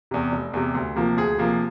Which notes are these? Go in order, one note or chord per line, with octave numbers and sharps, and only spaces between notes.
E2 C3
F1
E2 C3
D2
C3 F3 A#3
D2 G#4
C3 F3 A#3